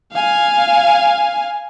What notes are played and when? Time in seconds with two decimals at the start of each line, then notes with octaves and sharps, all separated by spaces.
0.13 F5 G#5